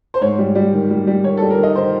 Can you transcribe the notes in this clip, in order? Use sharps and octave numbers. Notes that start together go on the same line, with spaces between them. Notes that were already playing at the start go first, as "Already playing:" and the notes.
C5
G#2 C#5
G3
G3
D#3
G3
G3
D#3 C#5
G3 A4
A#4
D#3
D#5
D#3 C5